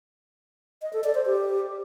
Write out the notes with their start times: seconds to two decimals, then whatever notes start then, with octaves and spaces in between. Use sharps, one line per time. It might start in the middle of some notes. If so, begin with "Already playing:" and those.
0.82 D#5
0.93 A4
1.04 D5
1.15 C5
1.26 G4